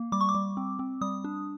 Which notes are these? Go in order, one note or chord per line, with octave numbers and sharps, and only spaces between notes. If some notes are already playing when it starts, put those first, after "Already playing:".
Already playing: A#3
G3 D6
C#6
D6
G3
C4
C4
G3 D#6
D4